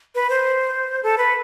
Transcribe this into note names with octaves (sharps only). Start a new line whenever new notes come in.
B4
C5
A4
B4